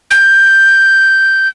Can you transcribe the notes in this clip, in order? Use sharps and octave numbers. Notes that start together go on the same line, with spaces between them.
G6